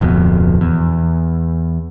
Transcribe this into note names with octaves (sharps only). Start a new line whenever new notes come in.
D1 F2 B2
E2